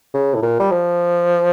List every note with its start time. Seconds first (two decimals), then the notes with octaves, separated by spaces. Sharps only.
0.14 C#3
0.34 A2
0.42 A#2
0.59 G3
0.71 F3